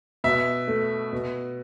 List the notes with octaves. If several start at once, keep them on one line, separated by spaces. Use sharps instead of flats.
B2 E5
A3
B2